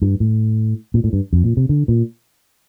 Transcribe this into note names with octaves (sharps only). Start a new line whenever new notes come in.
G2
A2
A#2
A2
G2
F2
A#2
C3
D3
A#2